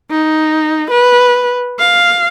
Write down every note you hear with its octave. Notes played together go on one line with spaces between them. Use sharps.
D#4
B4
F5